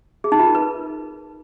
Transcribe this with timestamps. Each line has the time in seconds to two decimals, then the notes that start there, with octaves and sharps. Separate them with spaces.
0.24 G#4
0.32 D#4
0.39 F4
0.47 A#4
0.55 B4